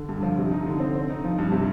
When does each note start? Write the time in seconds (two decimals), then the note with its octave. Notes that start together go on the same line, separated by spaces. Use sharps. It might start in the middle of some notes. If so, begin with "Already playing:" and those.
Already playing: D3
0.09 G2
0.23 F3
0.38 C3
0.51 D#4
0.67 D3
0.80 C4
0.95 C4
1.10 D#4
1.24 F3
1.38 G2
1.52 C3